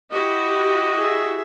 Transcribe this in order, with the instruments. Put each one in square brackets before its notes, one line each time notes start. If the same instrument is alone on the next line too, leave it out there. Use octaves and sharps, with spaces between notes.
[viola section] E4 F#4 G4 [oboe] D#5
[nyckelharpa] G#4 E5